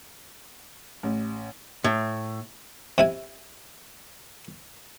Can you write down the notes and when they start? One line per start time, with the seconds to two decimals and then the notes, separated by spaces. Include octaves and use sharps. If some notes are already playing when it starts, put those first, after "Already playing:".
1.03 A1
1.84 A2
2.98 C3 E4 G#5